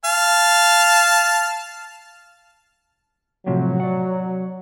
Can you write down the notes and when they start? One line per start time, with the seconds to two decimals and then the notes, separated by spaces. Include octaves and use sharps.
0.05 F5 A5
3.46 A2 C3 F3 F#3
3.80 D5 F#5